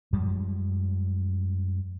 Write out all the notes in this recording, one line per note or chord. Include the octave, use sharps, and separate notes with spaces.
F#2 F3 G3 G#3